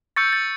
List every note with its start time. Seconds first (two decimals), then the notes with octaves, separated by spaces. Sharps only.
0.16 C#6 E6 G6 A6 C#7
0.33 A6